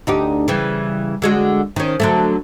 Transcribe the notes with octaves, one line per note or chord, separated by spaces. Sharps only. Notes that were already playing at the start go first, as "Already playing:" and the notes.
D2 D#4 G4
C#3 E3 G3
D3 G#3 F#4
D#3 C#4
D3 F#3 A3